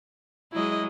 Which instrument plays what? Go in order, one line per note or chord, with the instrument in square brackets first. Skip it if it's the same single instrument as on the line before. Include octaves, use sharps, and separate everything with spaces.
[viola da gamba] F#3 G#3 [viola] E4 D#5